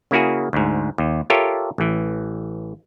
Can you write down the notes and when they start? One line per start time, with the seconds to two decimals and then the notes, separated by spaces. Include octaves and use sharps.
0.11 C#3 A#3 E4 F#4 G#4
0.53 D2 G#2
0.98 D#2
1.30 F4 G4 A4 A#4 C#5 E5
1.78 A1 E3